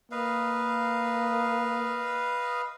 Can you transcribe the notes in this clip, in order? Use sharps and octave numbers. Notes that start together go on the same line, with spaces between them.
A#3 B4 D#5 F5